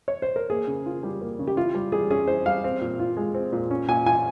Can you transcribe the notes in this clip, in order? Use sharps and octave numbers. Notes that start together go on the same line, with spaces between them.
C#5
C5
A#4
A#3 G#4
C#3
F4
G3
A#3
C#3
G4
E4 F4
G3
G3 G#4
C#4 G#4
E4 C5
G3 F5
C4
A#2
F4
G#3
C4
A#2
C#4
A#2 G#5
F4 G#5